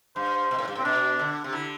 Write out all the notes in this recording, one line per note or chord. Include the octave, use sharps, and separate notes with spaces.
G2 C5
B2
A2
G2
A2 C4
B2 D4
D3
C3
D3 E4